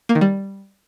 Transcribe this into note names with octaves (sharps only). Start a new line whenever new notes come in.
A#3
D#3
G3